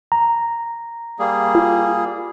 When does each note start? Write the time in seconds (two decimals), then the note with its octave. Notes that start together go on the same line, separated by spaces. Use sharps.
0.12 A#5
1.19 G3 A#3 G#4
1.55 F4